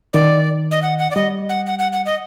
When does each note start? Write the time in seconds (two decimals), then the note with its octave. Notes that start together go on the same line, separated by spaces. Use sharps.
0.13 D#3 D5
0.71 D#5
0.82 F#5
0.99 F#5
1.11 D5
1.16 G3 D#5
1.49 F#5
1.66 F#5
1.79 F#5
1.93 F#5
2.06 D#5